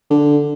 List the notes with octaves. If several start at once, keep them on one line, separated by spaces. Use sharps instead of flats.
D3